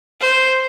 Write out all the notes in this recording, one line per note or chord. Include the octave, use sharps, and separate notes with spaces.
C5